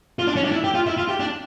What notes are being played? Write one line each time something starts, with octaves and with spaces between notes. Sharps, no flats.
F4
D4
C#4
D4
E4
G4
F4
E4
F4
G4
D4